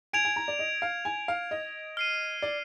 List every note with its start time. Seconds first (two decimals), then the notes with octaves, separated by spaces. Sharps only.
0.13 G#5 G#6 D7 F7
0.25 G#5
0.36 A#5
0.48 D5
0.59 D#5
0.82 F5
1.05 G#5
1.28 F5
1.51 D#5
1.97 F6 C7 D#7
2.42 D5